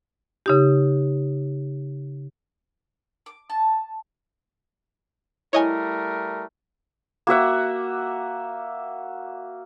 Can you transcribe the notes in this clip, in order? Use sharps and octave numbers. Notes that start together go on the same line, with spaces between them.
C#3 D#4 G4
D6
A5
G3 A3 E4 A#4 C#5 D#5 G#5
A#3 F#4 E5 F#5